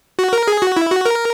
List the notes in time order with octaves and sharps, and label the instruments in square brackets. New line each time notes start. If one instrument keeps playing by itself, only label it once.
[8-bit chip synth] F#4
A#4
G#4
F#4
E4
F#4
A#4